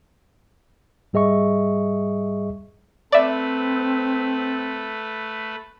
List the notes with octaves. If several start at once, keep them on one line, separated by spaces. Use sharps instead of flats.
G#2 G3 G#4 D#5 E5 C#6
A3 C4 B4 D5 E5